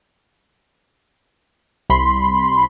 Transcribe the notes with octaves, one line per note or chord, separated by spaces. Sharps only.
C2 B5 C6